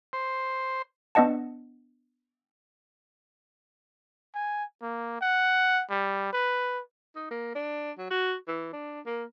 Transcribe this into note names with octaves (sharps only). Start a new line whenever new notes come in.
C5
B3 D4 D#5 F#5 A5
G#5
A#3
F#5
G3
B4
D#4
A#3
D4
F#3
F#4
E3
D4
A#3